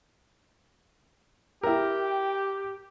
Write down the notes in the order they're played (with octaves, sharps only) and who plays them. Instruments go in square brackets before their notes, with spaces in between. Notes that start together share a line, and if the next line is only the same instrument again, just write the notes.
[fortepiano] E4 A#4 [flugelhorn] G4 [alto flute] G5